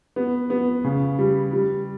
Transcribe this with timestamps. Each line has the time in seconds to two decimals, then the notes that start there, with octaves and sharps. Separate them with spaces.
0.16 B3
0.50 B3
0.84 C#3
1.18 G3
1.53 G3